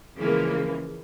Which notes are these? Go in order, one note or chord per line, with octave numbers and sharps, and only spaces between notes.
C#3 E3 F3 G#3 A#3